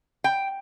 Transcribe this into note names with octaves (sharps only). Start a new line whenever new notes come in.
G5